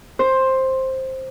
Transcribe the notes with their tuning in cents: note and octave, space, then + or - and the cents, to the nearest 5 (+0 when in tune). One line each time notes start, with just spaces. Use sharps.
C5 +10